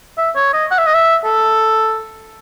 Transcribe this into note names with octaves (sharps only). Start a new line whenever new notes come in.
E5
C#5
D#5
F#5
E5
D#5
E5
A4